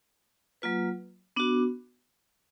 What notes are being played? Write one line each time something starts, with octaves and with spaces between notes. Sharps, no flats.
F#3 A#3 F4 B4
B3 D4 F#4